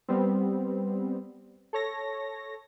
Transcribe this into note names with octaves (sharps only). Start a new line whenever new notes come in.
G3 B3 C4
A4 C#5 A#6